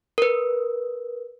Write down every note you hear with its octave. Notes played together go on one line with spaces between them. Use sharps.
A#4 B4